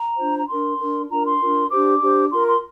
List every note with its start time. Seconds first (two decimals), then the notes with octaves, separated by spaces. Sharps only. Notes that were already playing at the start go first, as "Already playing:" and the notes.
Already playing: A#5
0.18 D4 F4 C5
0.38 A#5
0.48 D4 A#4 C6
0.79 D4 A#4
1.09 D4 F4 A#4 A#5
1.25 C6
1.40 D4 F4 A#4
1.71 D4 G4 C5 D6
2.00 D4 G4 C5
2.31 F4 A#4 C6
2.47 C6